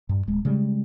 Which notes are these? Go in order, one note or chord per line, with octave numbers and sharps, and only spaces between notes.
G2
D1 G#3
C#3 G3 G#3